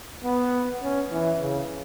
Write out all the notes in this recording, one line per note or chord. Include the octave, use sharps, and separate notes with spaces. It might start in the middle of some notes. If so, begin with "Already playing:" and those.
B3
C#4
E3
C#3